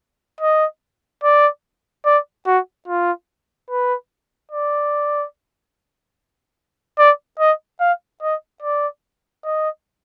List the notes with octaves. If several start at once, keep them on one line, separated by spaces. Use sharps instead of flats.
D#5
D5
D5
F#4
F4
B4
D5
D5
D#5
F5
D#5
D5
D#5